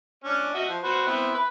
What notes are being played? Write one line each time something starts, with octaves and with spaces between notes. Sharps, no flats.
C#4 D4
F#4 D#5 E5
F3
F#4 B4 C5
B3 C4 E4
B4